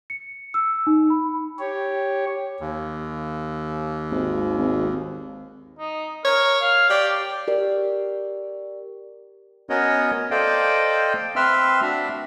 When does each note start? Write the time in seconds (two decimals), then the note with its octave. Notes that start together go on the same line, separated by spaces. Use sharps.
0.10 C#7
0.54 E6
0.87 D#4
1.10 B5
1.59 G4 C#5
2.60 D#2
4.11 G#1
4.57 G#1
5.79 D#4
6.25 A#4 C#5
6.62 F5
6.90 G4 D5
7.48 G4 A#4 D5
9.70 B3 C#4 F#4 A#4 C#5 D#5
10.31 A4 C5 D5 D#5 F5 G5
11.36 C4 B4 E5 C6 E6 F6
11.82 D4 F#4 E5